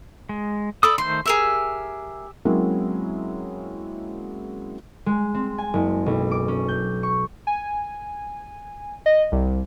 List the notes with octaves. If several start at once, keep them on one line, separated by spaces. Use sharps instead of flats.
G#3
A4 D5 B5 D#6 E6
D#3 A3 C5 C6
G4 G#4 A#4 E5 E6
F#3 G#3 A#3 C4 C#4 E4
G#3
C4
G#5
F#1
B1
D6
C#4
G6
C#6
G#5
D#5
C2